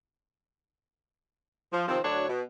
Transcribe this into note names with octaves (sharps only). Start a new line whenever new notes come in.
F3
C3 D#3 F3 C4
D2 D3 F#3 D4 C#5
B2